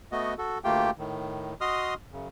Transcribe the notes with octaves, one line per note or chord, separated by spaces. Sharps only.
A3 B3 F#4 D#5
F#4 A4
D2 A3 A#3 F4 G4 G5
A2 D#3
F#4 D#5 C6 D#6 F6
F#2 C#3